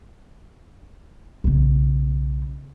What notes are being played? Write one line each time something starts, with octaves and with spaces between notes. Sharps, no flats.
B1 C#3